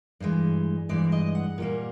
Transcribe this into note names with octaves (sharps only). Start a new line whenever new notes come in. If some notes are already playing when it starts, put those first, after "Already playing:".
G2 E3 G#3
G2 E3 G#3 D5
D#5
F#5
A#2 G3 A#3